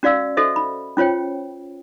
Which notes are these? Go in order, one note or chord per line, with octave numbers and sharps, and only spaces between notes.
C#4 F#4 D5 F5 E6
F#4 A4 C5 D#5 E5
B5
C#4 F4 C5 C#5 G5